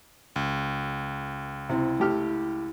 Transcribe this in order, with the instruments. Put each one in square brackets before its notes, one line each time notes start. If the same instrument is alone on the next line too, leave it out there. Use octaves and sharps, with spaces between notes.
[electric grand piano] C#2
[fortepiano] C3 C4 [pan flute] E4
[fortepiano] A3 G4 F6